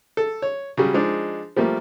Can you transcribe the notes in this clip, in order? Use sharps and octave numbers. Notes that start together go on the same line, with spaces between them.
A4
C#5
C#3 F#3 G3
F3 G#3 D4 D#4
F3 G3 A3 A#3